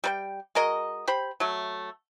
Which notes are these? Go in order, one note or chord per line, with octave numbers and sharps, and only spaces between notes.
G3 B4 G5
G#3 F#4 A#4 D#5
G4 C5 B5
F#3 A3